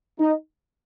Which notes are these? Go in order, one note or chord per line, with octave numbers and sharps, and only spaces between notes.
D#4